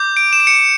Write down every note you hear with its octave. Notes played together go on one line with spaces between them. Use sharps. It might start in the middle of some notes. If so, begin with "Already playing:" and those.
Already playing: D6 G6
D7
E7
D7
C#7